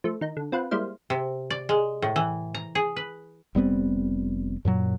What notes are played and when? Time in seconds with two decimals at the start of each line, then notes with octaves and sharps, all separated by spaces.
0.04 F3 A3
0.21 D#3 D#4
0.37 D3
0.52 C4 F4 B4 F#5
0.71 G3 G#3 A#3 E4 C5 F5
1.10 C3
1.50 D5
1.69 G#3
2.02 A2
2.16 E3
2.54 A#5
2.75 G#4
2.96 B4
3.55 F1 G3 B3 C4
4.65 F#2 A#2 F#3